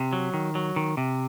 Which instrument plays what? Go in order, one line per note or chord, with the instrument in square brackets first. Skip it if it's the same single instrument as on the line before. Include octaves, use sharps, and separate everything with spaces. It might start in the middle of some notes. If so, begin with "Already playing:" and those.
Already playing: [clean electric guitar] C3
F#3
D#3
F#3
D#3
C3